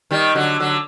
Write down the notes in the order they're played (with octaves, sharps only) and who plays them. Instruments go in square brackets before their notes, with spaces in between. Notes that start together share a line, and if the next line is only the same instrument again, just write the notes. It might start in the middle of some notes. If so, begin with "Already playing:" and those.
[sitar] D#3 G3
D3 F#3
D3 F#3